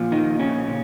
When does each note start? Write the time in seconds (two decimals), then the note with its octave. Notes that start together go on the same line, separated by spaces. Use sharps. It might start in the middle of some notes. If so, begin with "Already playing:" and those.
Already playing: A#2 F3
0.12 D#3 D#4
0.39 C#3 C#4
0.67 A#2